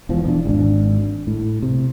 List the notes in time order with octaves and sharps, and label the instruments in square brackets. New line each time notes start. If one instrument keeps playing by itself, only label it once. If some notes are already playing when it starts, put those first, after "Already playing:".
[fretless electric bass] E1 E2 F3
E2 D4
G#1 D4
A2
C3